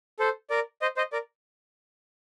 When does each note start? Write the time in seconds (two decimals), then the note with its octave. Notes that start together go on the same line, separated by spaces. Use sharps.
0.19 A4 C5
0.50 A#4 D5
0.82 C5 D#5
0.97 C5 D#5
1.12 A#4 D5